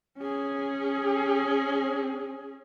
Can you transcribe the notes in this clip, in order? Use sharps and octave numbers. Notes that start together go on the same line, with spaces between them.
C#4 G#4